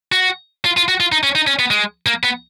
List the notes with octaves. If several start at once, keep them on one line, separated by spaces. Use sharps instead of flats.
F#4
F4
F4
F#4
F4
D#4
C#4
D#4
C#4
B3
G#3
A#3
B3